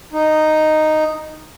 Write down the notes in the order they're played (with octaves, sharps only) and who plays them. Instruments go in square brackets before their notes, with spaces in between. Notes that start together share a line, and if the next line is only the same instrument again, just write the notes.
[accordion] D#4